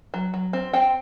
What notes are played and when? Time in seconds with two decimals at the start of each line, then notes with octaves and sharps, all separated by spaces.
0.14 F#3
0.34 F#3
0.53 C4
0.73 C4 G5